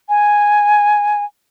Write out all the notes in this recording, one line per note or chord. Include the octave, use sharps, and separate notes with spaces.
G#5